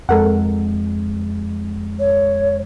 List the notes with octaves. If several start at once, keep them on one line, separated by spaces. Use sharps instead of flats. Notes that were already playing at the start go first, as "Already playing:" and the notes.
F2 G#3 A4 A#4 F#5
C#5